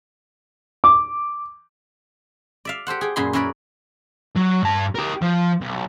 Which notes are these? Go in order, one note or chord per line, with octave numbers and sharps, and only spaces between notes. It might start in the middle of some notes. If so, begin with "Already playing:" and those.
D6
D5 E5 F5
G4 A4 C5 F#5
G#4 G5
F#2 A#2 G#4 B5 C6
C#4 E4 G#4 A#4 B4 D5
F#3
G2 A5
G4 A#4
F3
B1